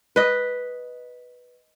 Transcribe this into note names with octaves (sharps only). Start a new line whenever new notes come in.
B4 D#5